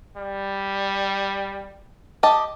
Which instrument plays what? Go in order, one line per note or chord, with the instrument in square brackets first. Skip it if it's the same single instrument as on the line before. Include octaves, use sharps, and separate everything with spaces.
[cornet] G3
[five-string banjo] G4 D#5 A5